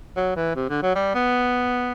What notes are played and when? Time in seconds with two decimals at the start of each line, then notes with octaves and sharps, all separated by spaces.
0.16 F#3
0.36 E3
0.56 C3
0.69 D3
0.82 F#3
0.95 G3
1.15 B3